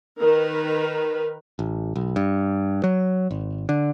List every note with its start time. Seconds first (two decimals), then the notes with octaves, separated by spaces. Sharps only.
0.19 D#3 A#4 B4
1.59 A1
1.96 B1
2.16 G2
2.84 F#3
3.31 G#1
3.69 D3